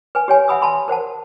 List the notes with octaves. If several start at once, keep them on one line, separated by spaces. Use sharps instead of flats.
B4 G#5
G4 C#5 G#5
E5 F#5 G#5 B5 D#6 E6
A5 B5 C6
A#4 C5 F#5 A5